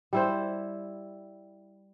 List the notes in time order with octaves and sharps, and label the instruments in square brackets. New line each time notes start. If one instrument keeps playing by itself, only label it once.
[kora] G3 E4 C5